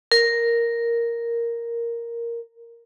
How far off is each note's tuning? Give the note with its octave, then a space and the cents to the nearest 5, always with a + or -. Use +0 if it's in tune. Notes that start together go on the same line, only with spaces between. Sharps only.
A#4 +0